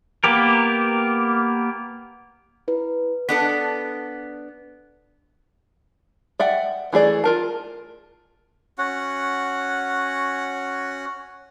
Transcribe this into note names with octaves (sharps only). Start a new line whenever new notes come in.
A#3 B3 G4 A#4
E4 B4
B3 D4 A4 B6
D5 E5 F#5 G5
E3 A3 G#4 D5
F4 A#4 A5
C#4 F#4 F#5